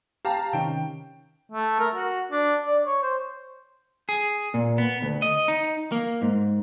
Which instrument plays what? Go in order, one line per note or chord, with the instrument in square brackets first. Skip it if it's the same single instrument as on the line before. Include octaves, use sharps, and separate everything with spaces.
[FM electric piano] G4 [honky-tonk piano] F5 A5 A#5
[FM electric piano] C3 D#3 C#4 [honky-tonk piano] G5
[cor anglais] A3
A#4
F#4
D4
D5
C#5
C5
[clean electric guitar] G#4
A#2
B3
D2
D#5
D#4
A#3
G#2